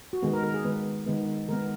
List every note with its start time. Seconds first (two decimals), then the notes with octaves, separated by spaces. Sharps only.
0.13 F#4
0.23 D#3 G#3 B3 G#4
0.34 A#4
0.44 A#4
0.54 G#4
0.64 D#3 G#3 B3 B4
1.07 D#3 G#3 B3
1.48 D#3 G#3 B3 A#4